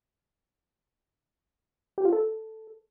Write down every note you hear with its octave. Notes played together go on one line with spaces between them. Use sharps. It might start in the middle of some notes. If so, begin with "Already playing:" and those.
G4
F4
A4